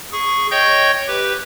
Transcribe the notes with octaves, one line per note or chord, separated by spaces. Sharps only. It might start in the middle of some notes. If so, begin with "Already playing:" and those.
G#4 C#6
C#5 D#5 G5 C#6 G6
G4 B4